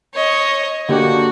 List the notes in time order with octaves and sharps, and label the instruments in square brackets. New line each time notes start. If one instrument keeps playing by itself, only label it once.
[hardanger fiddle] C#5 D#5
[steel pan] D3 A#3 G4 [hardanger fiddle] F#4